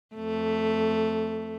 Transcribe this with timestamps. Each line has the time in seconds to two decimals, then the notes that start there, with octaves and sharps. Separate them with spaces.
0.15 F2 A3